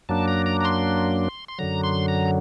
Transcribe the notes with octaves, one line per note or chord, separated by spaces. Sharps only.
F#2 F#3 A#3 D4 A5
A#5
A#5
A#5
C6
C6
F#2 D3 F#3 A#5
C6
A#5